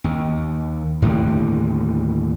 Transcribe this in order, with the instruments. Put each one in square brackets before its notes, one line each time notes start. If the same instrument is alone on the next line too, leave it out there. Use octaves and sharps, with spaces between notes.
[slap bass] D#2
D#2 A2 D3 G3